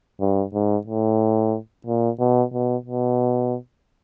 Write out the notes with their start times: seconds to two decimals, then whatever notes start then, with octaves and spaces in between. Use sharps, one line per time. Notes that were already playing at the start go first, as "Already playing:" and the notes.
0.20 G2
0.53 G#2
0.87 A2
1.86 A#2
2.19 B2
2.53 B2
2.86 B2